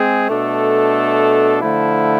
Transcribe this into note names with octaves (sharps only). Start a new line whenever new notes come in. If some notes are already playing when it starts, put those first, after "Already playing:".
Already playing: G#3 C4 G#4
B2 A3 D4 A4
D3 F3 A3 E4